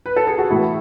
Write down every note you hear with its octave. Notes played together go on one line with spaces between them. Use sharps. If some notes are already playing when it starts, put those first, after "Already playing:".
B4
A4
G#4
F#4
A2 E3 E4